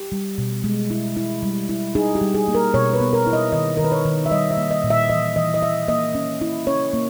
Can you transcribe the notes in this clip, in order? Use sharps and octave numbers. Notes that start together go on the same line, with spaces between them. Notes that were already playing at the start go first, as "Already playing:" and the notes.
Already playing: G4
G3
B2
G#3
E4
E4
G3
E4
D#4 G#4
G4
G3
G#4
A#3
A#4
B2 C#5
B4
B3
A#4
E4
D#5
D#3 D#5
D#3 A#4
B4
C#5
D#3
E5
G3 D#5
E5
A#3
D#5
A#2
E5
E3 D#5
E3 D#5
D#5
E3 E5
A#3 D#5
C#4
E4
C#4 C#5
A#3